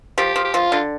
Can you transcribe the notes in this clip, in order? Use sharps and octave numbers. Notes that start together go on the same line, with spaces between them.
F3 G4
F3
G4
F3 F4
D3